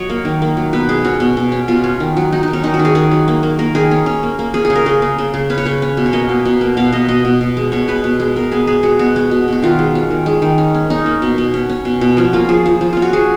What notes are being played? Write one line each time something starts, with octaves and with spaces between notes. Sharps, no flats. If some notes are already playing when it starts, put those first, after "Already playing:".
Already playing: F#3 C#5 D#5
A#3
D#3
A#3
F#3
B2 B4
G#3 G#4
C#4 F#4
B2
B2
C#4
B2 F4
C#4
D#3
F#3
F#3 D#4
D#3 D#4
C#4
D#3 D#4
F#4
D#3
G#4
D#3 G#4
F#3
A#3
A#3
A#3 A#4
D#3 G#4
C#4
C#4
A#3
A#3
C#4 G#4
G#4
C#3
A#4
C#3 G#4
C#3
C#3
C#3
C#4 B4
C#5
C#3 B4
C#4
B2
C#5
A#3 D#5
B2
B2
A#3
B2 F5
B2 D#5
B2 D#5
B2
B2
G#3
B2 C#5
G#3 B4
B2
G#3
B2 A#4
B3 G#4
B3 G#4
G#3 F#4
B2 F#4
G#3
B2
B2 F#4
D#3 F4
G#3
C#4
D#3
G#3
D#3
C#4
C#4
C#4 D#4
A#3
B2
B2
C#4
C#4
B2
B2
F3 C#4
A#3 F4
F3 G#4
F3
F3
C#4 F4
F#4
F3 G#4